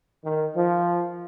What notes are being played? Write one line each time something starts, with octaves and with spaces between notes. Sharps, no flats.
D#3
F3